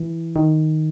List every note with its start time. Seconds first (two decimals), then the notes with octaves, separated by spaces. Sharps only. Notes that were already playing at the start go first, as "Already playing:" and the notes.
Already playing: E3
0.36 D#3